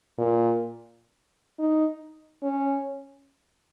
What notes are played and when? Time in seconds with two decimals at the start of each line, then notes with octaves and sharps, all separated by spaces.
0.18 A#2
1.59 D#4
2.43 C#4